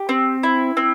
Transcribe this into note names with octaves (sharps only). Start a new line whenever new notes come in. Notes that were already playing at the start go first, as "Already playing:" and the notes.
Already playing: G4
C4
E4
C4